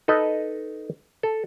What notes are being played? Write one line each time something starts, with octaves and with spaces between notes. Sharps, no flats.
D#4 A4 B4 D#5
A4